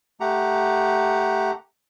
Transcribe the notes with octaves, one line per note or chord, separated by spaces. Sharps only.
A3 G4 F#5 A#5